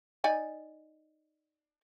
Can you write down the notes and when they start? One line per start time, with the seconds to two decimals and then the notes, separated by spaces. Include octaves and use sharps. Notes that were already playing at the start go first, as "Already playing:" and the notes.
0.24 D#4 D5 G#5